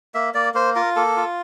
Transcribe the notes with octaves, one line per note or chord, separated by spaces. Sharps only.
A#3 E5
A#3 D5
A#3 C5
F4 A#4
A#3 A4
F4